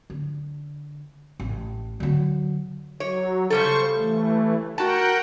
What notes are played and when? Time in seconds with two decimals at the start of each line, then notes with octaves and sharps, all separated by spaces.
0.10 D3
1.40 A1
2.00 D3 F#3
3.00 F#3 C#5
3.50 C#3 G3 A4 C5 C#6
3.96 E3 A3
4.78 F#4 A#4 F#5 G5 A5